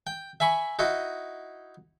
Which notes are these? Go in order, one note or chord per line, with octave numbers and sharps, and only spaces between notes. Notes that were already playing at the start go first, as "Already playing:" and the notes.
G5
E5 G#5 B5 C#6
D#4 E4 F#4 D#5